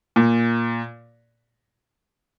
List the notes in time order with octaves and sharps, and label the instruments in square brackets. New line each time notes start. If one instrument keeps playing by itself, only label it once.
[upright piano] A#2